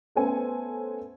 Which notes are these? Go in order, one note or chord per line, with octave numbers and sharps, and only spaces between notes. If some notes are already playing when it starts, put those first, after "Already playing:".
A3 B3 C#4 A4 C5 G#5